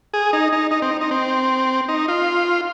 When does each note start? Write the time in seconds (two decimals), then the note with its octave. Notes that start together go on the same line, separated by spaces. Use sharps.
0.14 G#4
0.33 D#4
0.52 D#4
0.71 D#4
0.82 C4
0.91 D#4
1.01 D#4
1.11 C4
1.89 D#4
2.08 F4